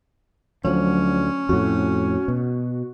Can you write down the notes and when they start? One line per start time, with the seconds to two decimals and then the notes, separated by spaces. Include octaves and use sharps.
0.65 D2 F3 F#3 C#4
1.49 F2 A2 F#4
2.28 B2